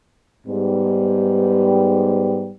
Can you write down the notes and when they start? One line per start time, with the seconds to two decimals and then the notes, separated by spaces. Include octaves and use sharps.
0.47 G#2 G3 B3